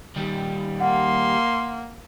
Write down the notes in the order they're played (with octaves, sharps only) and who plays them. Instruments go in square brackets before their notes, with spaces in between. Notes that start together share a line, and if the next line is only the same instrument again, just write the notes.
[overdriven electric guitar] D#2 G3
[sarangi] A#3 [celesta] F#5 [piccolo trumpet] C6